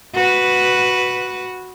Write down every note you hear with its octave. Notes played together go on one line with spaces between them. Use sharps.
F#4 B4